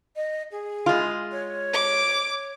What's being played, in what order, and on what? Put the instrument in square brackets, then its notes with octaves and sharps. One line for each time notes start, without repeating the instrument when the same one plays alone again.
[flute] D#5
G#4
[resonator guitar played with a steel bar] G#3 F4
[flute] C#5
[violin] D6